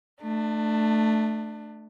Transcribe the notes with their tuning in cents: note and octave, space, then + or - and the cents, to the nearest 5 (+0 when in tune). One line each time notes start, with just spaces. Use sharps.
A3 +0 D4 +25